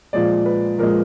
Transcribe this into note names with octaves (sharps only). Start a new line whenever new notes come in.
A#2 F3 G#3 D5
B4
A#2 F3 G#3 A#4